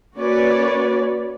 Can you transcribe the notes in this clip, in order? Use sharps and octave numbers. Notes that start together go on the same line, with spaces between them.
A#3 C#4 F#4 B4 C#5 D5